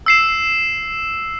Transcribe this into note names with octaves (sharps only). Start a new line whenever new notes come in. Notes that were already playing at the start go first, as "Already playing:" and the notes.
E6 C7 E7